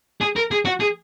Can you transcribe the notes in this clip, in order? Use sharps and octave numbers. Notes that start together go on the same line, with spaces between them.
G#4
A#4
G#4
F#4
G#4